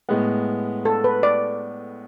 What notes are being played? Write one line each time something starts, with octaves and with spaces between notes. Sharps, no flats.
A2 G#3 B3
A4
B4
D5